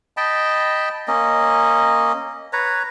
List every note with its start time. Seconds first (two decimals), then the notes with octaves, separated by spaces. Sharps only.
0.17 D#5 G5 A5 B5
1.08 A#3 C#4 D#5
2.53 B4 C#5 A#5